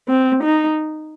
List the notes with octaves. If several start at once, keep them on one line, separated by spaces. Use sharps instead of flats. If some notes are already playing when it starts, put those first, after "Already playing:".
C4
D#4